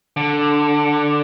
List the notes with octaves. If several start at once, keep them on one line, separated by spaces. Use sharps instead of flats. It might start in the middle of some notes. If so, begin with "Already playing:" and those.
D3